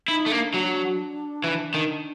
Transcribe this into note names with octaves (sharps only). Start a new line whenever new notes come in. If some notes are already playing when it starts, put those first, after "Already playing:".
D#4 E4
A3
A#3 D4
F#3
E3
D#3